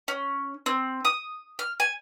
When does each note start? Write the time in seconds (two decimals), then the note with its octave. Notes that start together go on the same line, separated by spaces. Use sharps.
0.08 C#4
0.66 C4
1.05 D#6
1.59 F6
1.80 G#5